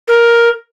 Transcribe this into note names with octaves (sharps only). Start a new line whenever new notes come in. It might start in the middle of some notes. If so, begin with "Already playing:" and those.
A#4